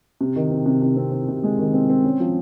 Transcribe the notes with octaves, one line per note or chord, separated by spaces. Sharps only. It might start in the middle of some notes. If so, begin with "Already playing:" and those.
C3
D#3
C4
C3
C3
C4
C4
C3
G#3
D#3
C4
C4
C#4
F3